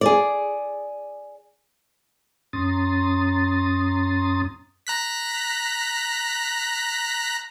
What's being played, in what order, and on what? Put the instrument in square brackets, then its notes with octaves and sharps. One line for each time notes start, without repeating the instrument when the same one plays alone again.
[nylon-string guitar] G#4 D5
[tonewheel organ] F#2 C#4 A#5 C6 D#6 A6
[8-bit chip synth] A#5 F#6 B6